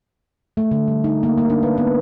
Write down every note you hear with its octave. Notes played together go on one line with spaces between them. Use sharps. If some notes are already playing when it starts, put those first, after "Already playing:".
A3
D3
G3
D#4
A#3
A#3
D4
B4
B3